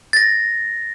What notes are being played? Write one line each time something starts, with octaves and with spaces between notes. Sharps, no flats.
A6 A#6